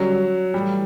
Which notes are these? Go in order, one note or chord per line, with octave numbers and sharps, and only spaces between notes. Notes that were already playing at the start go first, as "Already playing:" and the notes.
Already playing: D3 F#3 G3 C#4
A2 E3 G3